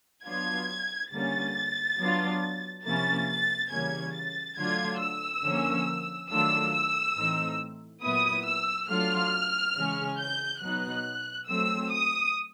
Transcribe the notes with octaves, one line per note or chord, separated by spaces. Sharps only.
F#3 B3 D4 F4 G#6
D3 G3 A#3 C#4 A6
F#3 B3 D4 F4
C3 F3 A#3 C#4 E4 A6
A6
C#3 E3 G3 A#3 C#4 G#6
A6
D3 F#3 A3 D4 F4 G#6
E6
D3 F3 A#3 C#4
D#3 F#3 A3 D4 F4 E6
E6
A2 E3 A3 C4 D#4
A#2 F#3 B3 E4 D#6
E6
F#3 A3 D4 F4 F6
C#3 E3 G#3 C#4
G6
B2 F#3 B3 D#4 F#6
F#3 A3 C4 E6
D#6